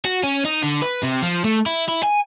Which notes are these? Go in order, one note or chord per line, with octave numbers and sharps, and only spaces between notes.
F#4
C#4
D#4
D3
B4
C3
F3
A3
E4
E4
G#5